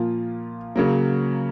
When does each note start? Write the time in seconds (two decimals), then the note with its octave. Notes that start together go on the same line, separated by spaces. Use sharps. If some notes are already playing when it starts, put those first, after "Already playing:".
Already playing: A#2 F3 A#3 F4
0.76 C#3 F#3 A#3